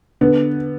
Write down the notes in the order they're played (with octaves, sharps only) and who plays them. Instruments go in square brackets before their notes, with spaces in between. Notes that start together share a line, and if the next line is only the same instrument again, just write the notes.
[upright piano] D3 B3